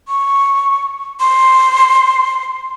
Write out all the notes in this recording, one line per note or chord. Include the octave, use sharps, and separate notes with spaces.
C#6
C6